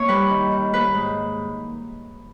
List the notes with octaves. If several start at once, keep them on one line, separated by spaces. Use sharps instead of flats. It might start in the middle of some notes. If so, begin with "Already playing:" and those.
Already playing: A#3 C#5 E5
G3 B4
D#3
D#3
A#3 B4
G#2